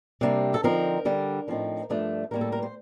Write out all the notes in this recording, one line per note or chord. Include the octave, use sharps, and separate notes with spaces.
C3 G3 A#3 D4
A4
D3 F3 C4 D#4 A#4
D3 G3 D4
A2 F3 C4 D#4
G2 F3 A3 D4
A2 G3 A#3 A#4
A4
A#4
C5